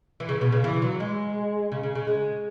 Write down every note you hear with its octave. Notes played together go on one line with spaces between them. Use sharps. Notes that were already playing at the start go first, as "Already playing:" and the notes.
E3
C#3
B2
C#3
E3
F#3
G#3
C#3
C#3
C#3
G#3